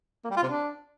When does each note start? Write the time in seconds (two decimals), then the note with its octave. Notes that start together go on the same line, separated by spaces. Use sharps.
0.24 A#3
0.30 G3
0.36 F4
0.43 C3
0.49 D4